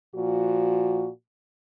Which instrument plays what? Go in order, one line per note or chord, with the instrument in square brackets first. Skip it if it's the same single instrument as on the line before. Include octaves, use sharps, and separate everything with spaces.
[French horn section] A#2 F3 F#4